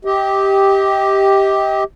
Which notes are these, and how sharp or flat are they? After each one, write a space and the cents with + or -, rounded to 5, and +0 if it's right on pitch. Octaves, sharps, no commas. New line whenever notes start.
G4 +0 D#5 +35